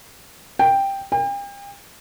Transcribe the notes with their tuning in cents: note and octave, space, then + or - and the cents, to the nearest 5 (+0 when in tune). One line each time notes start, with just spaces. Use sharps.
G5 +5
G5 +40